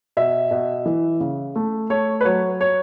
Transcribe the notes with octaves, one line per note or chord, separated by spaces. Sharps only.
B2 E5
B2
E3
C#3
A3
A3 C#5
B4
F#3 C#5
C#5